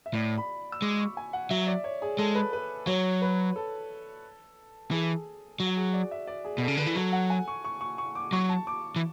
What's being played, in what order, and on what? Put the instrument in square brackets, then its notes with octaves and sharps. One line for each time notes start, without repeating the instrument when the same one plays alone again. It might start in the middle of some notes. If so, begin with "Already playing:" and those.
[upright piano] E5
[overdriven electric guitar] A2 [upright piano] D5
[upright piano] B5
E6
[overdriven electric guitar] G#3 [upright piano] D6
[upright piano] C#6
G#5
F#5
[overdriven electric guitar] F#3 [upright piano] E5
[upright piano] D5
C#5
G#4
[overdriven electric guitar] G#3 [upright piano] A4
[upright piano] B4
B4
[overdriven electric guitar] F#3 [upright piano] C#5
[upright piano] B4
A4
[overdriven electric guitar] E3 [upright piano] G#4
[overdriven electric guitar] F#3
[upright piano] F#4
G#4
D5
E5
D5
G#4
[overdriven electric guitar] B2 [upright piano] A4
[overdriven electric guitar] C#3
[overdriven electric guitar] D3 [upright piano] B4
[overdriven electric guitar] E3
[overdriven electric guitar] F#3 [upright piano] A4
[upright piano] F#5
G#5
C#6
C#6
C#6
C#6
D6
[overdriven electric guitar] F#3 [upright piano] C#6
[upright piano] A5
D6
[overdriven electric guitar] E3